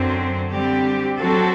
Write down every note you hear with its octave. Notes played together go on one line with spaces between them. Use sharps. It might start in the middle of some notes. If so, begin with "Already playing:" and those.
Already playing: F#2 D3 F#3 C4
D3 G3 C4 G4
F#3 C4 F#4 A4